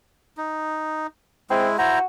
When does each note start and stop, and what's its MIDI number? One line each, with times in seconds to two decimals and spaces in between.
0.37 1.07 63
1.50 1.77 56
1.50 1.68 60
1.50 1.77 64
1.78 1.99 64
1.78 2.05 66
1.78 1.99 72
1.78 1.99 82